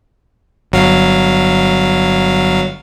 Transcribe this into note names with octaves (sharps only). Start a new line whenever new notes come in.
G1 F#3 F5